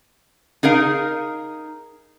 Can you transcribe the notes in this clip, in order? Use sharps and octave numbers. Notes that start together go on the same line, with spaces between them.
D#4 G#4 A#4 F5